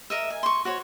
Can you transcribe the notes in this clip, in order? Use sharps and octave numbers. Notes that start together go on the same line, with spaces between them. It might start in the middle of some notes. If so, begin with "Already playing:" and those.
A#4 D#5 E5
G#5
C6 C#6
F#4 C5 C#5